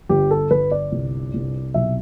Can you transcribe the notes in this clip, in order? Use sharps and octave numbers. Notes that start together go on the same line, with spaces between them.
G1 G4
A4
G1 B4
D5
C2
C2
B1 E5